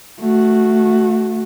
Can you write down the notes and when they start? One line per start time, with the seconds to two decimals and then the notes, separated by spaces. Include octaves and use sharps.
0.20 A3 F#4